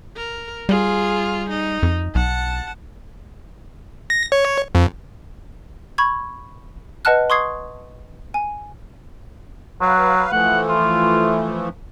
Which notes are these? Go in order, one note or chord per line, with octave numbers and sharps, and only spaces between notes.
A#4
G3 F4 G#4
D#4
F2
B1 F#5 A5
A#6
C#5
F2
B5 C#6 G#6
B4 D#5 F#5 A5 F6 F#6
C6 C#6 D#6 G#6 C7
G#5
F#3 B4 F5
E3 F3 A3 F#5
F4